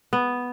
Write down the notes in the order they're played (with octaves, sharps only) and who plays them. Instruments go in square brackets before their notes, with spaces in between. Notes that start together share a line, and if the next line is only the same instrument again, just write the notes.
[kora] B3